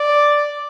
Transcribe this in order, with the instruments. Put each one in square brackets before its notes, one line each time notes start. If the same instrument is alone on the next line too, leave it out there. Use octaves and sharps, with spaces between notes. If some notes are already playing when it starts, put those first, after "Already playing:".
Already playing: [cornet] D5